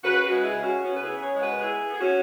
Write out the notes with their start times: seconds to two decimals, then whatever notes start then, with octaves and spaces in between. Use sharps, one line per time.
0.04 C#3 F#4 B4
0.24 F#4 B4
0.30 G#3
0.43 E4 G#4
0.56 C#3
0.63 C#4 F#4
0.82 B3 C#4 F#4
0.96 B4
1.02 E4 G#4
1.08 C#3
1.17 B4
1.21 G#4 C#5
1.35 G#3
1.42 F#4 B4
1.60 B3 E4 G#4
1.88 B3
1.93 G#4
1.99 C#4 F#4